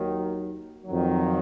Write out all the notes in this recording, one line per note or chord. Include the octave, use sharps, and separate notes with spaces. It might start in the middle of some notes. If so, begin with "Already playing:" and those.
Already playing: D#2 D#3 F#3
F2 D#3 F#3